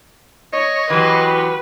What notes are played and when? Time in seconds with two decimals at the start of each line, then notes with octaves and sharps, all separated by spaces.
0.53 C#5 D#5
0.90 E3 F#3 F#4 G4 B4 C6